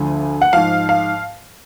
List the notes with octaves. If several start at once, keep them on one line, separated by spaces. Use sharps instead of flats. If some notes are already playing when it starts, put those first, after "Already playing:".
Already playing: D2 D3 F3 G#5
F#5
G#2 F3 F5
F5